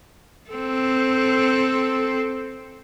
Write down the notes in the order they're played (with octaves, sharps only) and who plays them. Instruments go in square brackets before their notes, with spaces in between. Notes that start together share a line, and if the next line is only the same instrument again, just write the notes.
[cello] C4 A4